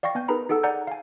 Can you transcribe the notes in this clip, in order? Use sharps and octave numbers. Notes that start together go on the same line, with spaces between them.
D5 F5 G5 C#6 A#6
B3 G#5 G6
D#4 G#4 A#4 B4 A#5 B5
D#4 G#4 A4 F#5 E6
D5 F#5 G#5 A#5 G6
F5 G#5